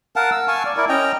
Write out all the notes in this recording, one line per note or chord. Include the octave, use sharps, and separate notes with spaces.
A#4 F5 F#5 A5
E6
F5 G#5 A5 C#6
D5
E4 A#4 D5
C#4 D#5 G5 A#5